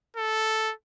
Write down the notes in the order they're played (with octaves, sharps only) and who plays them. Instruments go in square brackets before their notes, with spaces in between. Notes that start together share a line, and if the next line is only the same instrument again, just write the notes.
[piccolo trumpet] A4